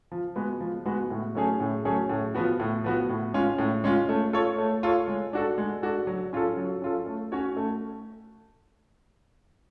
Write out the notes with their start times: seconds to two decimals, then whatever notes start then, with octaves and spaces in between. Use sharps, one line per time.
0.12 F3
0.36 G#3 B3 F#4
0.60 F3
0.85 G#3 B3 F#4
1.10 A2
1.35 F#3 A3 C#4 G#4
1.60 A2
1.85 F#3 A3 C#4 G#4
2.09 A2
2.35 F3 B3 F#4
2.60 A2
2.84 F3 B3 F#4
3.09 A2
3.34 G#3 C#4 F4
3.59 A2
3.84 G#3 C#4 F4
4.09 A3
4.33 F4 A4 C#5
4.58 A3
4.83 F4 A4 C#5
5.08 G#3
5.33 D4 F#4 A4
5.58 G#3
5.82 D4 F#4 A4
6.07 F#3
6.33 C#4 F4 A4
6.57 F#3
6.82 C#4 F4 A4
7.07 A3
7.32 C#4 F#4 C#5
7.57 A3